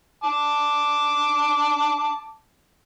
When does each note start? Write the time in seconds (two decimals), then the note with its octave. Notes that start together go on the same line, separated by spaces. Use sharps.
0.24 A5 D6